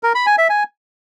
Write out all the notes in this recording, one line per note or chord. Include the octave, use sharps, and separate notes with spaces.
A#4
B5
G#5
E5
G#5